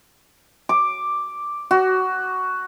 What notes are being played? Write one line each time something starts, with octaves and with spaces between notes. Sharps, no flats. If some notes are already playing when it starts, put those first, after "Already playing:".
D6
F#4